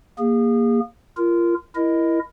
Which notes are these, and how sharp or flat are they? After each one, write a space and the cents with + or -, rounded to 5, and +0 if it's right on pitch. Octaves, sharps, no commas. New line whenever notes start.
A#3 +5 G#4 -30
F4 -25 A#4 +0
E4 +15 A#4 +15 D#5 +0